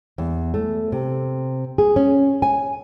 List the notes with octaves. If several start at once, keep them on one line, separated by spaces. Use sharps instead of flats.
E2
A3
C3
G#4
C#4
G#5